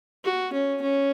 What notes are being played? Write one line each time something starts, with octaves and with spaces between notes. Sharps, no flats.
F#4
C#4
C#4